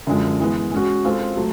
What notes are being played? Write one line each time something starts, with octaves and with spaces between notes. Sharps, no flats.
F#2 D3 F3 G#3
E3 G#3 B3
G#3 C#4 F#4
G#3 C4 F4 A4
F#3 A3